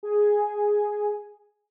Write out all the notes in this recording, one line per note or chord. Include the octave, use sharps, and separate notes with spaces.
G#4 G#5